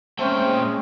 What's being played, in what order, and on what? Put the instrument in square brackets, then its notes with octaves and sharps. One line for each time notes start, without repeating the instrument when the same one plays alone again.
[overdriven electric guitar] A#2 G5 [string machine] G#3 [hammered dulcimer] A3 C4 C#4 [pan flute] C5